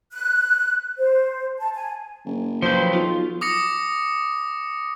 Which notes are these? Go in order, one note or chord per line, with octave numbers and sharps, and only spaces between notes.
F#6
C5
A5
G#5
F#1
F3 F#3 B4 C5 G5
B1 F4
D6 D#6 A#6 C#7